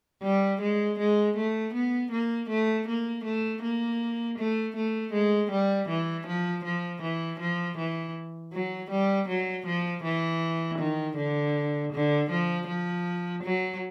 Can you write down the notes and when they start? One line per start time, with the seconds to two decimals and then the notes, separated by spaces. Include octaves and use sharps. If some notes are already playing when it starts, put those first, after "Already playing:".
0.23 G3
0.61 G#3
0.99 G#3
1.37 A3
1.74 B3
2.12 A#3
2.49 A3
2.88 A#3
3.25 A3
3.62 A#3
4.38 A3
4.76 A3
5.13 G#3
5.51 G3
5.89 E3
6.27 F3
6.65 F3
7.03 E3
7.40 F3
7.78 E3
8.53 F#3
8.91 G3
9.28 F#3
9.66 F3
10.04 E3
10.79 D#3
11.17 D3
11.93 D3
12.31 F3
12.68 F3
13.43 F#3